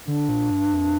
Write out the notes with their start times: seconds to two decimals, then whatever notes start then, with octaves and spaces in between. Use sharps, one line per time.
0.06 D3 D4
0.29 A#2
0.51 G2
0.73 F2